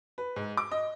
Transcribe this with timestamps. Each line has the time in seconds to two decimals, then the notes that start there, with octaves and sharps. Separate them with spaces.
0.18 B4
0.36 G#2
0.57 D6
0.71 D#5